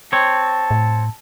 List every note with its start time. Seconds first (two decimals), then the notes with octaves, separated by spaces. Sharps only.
0.13 C4 C#5 A5
0.71 A2